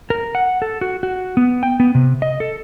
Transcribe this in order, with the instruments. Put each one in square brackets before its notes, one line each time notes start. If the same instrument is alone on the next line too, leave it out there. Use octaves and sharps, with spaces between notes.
[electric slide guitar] A#4
F#5
A4
F#4
F#4
B3
G5
B3
C3
D#5
A4